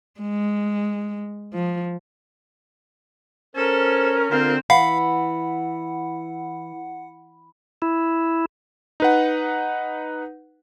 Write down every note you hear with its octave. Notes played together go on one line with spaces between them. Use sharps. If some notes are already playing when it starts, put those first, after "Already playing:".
G#3
F3
C#4 A4 A#4 C5
D3 C4 F4 F5
E3 F5 F#5 B5
E4
D#4 B4 F#5